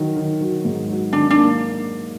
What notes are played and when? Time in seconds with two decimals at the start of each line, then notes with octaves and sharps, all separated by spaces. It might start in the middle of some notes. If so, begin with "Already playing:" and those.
Already playing: D#3 F#3
0.17 D#3
0.41 F#3
0.65 G#2
0.89 F#3
1.13 D#3 D4
1.30 D4
1.37 A#3